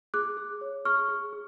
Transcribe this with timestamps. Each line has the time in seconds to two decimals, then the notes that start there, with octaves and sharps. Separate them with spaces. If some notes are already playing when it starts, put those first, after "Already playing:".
0.14 G#4 D6 F#6
0.37 G#4
0.61 C#5
0.85 G#4 C#6 F6
1.08 G#4
1.33 G#4